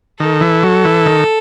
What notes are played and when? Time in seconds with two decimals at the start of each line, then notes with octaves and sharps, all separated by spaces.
0.19 D#3 A4
0.41 E3
0.63 F#3
0.85 E3
1.06 D#3